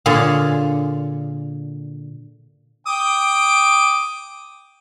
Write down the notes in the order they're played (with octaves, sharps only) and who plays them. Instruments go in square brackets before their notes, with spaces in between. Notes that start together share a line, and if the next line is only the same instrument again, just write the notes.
[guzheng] A#2 D3 F4 G#4 C#5 G#5
[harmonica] G5 D6 D#6